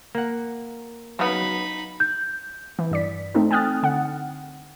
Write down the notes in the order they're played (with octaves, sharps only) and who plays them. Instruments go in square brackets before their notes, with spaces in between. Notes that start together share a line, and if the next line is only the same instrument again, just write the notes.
[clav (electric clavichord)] A#3 F#5
[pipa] C#3 B3 [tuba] F#3 [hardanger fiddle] D#4 B5
[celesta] G6
[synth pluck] E3
G2 D5 B6
A3 C4 D#4 A4
G5 G#5 D#6 F6 F#6 A6
D3 F#5